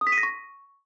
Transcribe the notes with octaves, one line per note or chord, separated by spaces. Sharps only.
D#6
B6
D#7
A#6
C#6